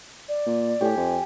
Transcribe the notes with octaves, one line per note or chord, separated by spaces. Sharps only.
D5
A#2
A2 G4 G#5
F2